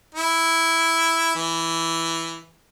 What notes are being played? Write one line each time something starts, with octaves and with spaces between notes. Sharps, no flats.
E4
E3